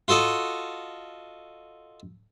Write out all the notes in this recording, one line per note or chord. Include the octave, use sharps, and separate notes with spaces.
F4 F#4 A4 D#5